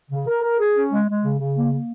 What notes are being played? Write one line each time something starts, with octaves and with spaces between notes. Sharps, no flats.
C#3
A#4
A#4
G#4
C#4
G#3
G#3
C#3
C#3
A#3
A#3